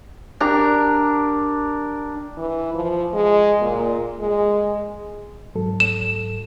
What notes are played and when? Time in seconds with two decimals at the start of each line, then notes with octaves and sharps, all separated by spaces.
0.40 D4 G4 A#4 A#5
2.38 E3
2.74 F3
3.13 G#3
3.61 A#2
4.20 G#3
5.55 G#2 F#3 A4
5.80 E7